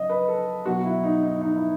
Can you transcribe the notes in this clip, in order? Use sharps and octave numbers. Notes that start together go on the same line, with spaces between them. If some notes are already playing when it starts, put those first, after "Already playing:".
Already playing: C#3 F#3 D#5
B4
A4
B2 F#3 F#4
E4
D#4
D#4
D#4
E4